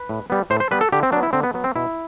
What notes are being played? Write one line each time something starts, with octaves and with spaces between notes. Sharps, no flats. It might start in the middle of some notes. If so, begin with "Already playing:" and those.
Already playing: B4
A2
G3 B3
A2 C5
C5
G3 B3 B4
A4
D3 G4
C4
F#3 B3 D4
E4
D3 C4
B3
F#3 B3
C4
B2 E4